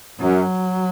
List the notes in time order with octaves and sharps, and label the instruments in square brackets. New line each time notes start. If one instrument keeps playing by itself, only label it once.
[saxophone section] F#2 [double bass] F#3